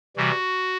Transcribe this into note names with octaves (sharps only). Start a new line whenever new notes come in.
C3 E3 G3 F#4